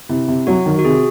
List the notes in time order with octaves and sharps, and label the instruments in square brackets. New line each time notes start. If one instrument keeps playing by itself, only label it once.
[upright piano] C3 [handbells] E4
[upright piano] C3
[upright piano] F#3 [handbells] F#4
[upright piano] D#3
[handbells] F#4
[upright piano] C3 [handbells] G#4